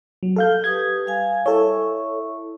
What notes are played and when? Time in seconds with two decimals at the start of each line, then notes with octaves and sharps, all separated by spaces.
0.23 F#3
0.36 A4 F5 G6
0.64 G4 B4 D#6 G#6
1.06 G3 F5 G#5
1.46 E4 A4 C#5 E5 C#6